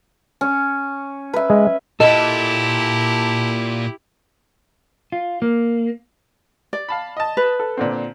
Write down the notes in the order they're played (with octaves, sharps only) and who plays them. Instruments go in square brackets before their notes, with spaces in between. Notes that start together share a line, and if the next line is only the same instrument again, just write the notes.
[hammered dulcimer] C#4
B4 E5
[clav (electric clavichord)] G#3
[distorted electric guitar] A#2 [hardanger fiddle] E4 G4 [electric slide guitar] A4 [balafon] D#5
[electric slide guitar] F4
A#3
[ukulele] D5
[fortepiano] F5 A5 B5
D#5 A5
[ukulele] B4
[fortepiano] A4
A#2 D3 C4